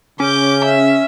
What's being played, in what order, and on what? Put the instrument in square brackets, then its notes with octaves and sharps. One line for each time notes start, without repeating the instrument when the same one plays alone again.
[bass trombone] C#3 [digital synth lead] C#4 [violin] D6 G6
[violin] E5